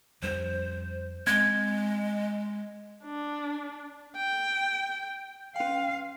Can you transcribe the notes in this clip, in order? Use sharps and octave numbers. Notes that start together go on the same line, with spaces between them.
F2 G3 C5
G#3 C4 G#6
D4
G5
C#4 F5 G5